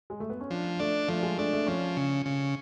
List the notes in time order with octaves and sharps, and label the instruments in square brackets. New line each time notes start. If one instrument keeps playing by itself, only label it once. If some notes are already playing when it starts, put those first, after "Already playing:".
[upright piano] G#3
A3
B3
C#4
[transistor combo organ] F3 [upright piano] D4
[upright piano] A3 [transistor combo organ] D4
[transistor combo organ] F3 [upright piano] A3
[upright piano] G#3
[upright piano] A3 [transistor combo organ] D4
[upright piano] A3
[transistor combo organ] F3 [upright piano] C#4
[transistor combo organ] C#3
C#3